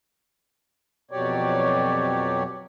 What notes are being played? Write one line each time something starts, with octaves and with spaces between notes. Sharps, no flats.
F2 B2 F#3 G4 C#5 D5